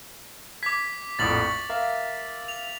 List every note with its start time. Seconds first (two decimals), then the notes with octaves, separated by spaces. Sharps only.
0.63 D6 G#6 B6
1.19 A#1 F2 A2 A6 F#7
1.42 C#6
1.69 A#4 E5 F5
2.48 F7